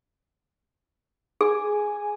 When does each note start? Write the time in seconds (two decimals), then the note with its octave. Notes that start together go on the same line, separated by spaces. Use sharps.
1.41 G#4 G#5